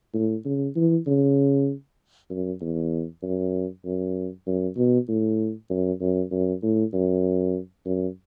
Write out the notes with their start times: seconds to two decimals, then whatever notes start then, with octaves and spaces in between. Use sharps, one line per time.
0.14 A2
0.45 C#3
0.76 E3
1.07 C#3
2.30 F#2
2.61 E2
3.23 F#2
3.85 F#2
4.46 F#2
4.77 B2
5.08 A2
5.70 F#2
6.01 F#2
6.31 F#2
6.63 A2
6.93 F#2
7.86 F#2